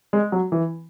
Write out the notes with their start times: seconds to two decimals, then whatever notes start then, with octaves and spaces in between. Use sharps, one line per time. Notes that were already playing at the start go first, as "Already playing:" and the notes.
0.13 G#3
0.32 F#3
0.52 E3